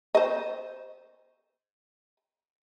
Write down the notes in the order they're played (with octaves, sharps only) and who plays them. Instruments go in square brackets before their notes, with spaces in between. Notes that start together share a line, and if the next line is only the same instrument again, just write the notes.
[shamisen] C5 D#5